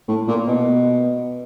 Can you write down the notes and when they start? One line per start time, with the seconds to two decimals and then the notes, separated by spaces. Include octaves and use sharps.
0.08 A2
0.28 A#2
0.48 B2